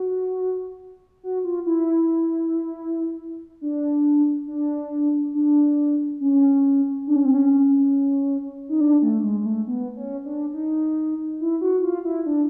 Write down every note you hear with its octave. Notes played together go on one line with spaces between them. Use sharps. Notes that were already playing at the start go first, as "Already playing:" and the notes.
Already playing: F#4
F#4
F4
E4
D4
D4
D4
C#4
D4
C#4
C4
C#4
D#4
D4
A3
G#3
G#3
A3
B3
C#4
D4
D#4
E4
F#4
F4
E4
D4